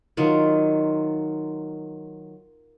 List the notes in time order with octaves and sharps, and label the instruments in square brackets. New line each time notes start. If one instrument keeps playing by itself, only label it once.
[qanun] D#3 F#3 F4